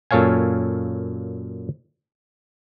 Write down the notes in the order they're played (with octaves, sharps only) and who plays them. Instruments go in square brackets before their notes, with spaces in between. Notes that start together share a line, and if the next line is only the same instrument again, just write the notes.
[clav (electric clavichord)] F#2 A#2 A4 C#5 F5 G#5